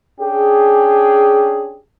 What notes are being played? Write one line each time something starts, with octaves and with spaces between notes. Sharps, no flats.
C#4 D4 G4 G#4